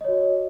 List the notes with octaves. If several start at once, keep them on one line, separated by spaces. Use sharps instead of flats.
F#4 C#5 D#5